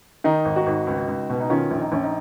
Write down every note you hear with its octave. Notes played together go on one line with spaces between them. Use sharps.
D#3 D#4
G#1
D#4 F#4
G#1
C#2
C#2
B2
D#4
D#3 C#4 F4
A#1
D#4
A#1 C#4
D#4